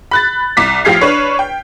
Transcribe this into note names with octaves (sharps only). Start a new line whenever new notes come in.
B5 F#6 A6
C2 D6 B6
A1 F3 G4 F6 G#6 C7
D4 B4 C#5
G5